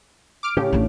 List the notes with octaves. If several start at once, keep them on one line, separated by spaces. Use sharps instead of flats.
D6 F6 D7
A2 C#3 C#4 G4
A1 D3